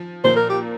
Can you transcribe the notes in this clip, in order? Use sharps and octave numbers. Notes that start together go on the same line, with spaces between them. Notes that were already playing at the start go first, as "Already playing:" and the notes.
Already playing: F3
A#2 F3 A#3 C5
A#4
G4